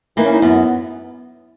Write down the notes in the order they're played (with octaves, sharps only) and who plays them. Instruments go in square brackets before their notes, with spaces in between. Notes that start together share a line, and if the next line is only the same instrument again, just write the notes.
[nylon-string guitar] E3 A#3 [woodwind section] D#4
[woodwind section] C#4
D#4
[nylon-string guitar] F#2 [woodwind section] B3